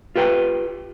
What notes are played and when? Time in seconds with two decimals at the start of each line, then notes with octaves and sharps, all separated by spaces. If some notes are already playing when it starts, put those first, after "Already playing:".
0.16 F4 G4 B4 G5